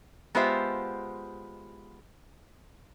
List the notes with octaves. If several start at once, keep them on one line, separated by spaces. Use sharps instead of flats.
G#3 B3 F4 G4 C5 E5